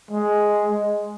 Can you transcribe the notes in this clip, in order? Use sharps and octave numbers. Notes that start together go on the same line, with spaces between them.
G#3